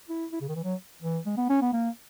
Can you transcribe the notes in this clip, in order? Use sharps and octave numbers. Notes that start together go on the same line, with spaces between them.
E4
E4
C#3
D#3
E3
F#3
E3
G#3
B3
C#4
B3
A#3